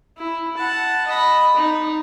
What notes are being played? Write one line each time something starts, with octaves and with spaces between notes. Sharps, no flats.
E4
F#5 A5
D#5 B5
D#4